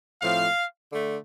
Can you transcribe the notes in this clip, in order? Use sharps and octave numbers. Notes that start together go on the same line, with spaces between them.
A2 F3 C4 F5
D3 A3